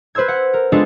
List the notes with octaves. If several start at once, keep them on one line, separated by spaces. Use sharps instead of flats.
B4 C5 C6 E6 G#6
F#5
A#4
G#3 B3 D4 F4 G#4 A4